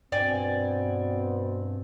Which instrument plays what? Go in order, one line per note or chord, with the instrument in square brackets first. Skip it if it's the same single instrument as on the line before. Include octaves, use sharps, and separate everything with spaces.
[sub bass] G2 [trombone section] B2 B3 C4 [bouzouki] D5 G5 G#5